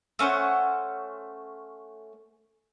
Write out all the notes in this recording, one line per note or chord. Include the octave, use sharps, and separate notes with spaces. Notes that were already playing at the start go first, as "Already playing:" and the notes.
A3 C#4 C5 F#5